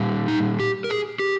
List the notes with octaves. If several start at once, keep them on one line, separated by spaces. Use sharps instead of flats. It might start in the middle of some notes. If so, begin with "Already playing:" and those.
Already playing: A#2 G3
D#4
G4
A#4
G#4
G4